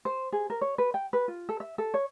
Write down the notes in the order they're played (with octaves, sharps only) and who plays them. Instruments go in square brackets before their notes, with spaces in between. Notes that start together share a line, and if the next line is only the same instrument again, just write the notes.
[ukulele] C5
G#4
A#4
C#5
B4
G5
B4
F4
A4
E5
A4
C#5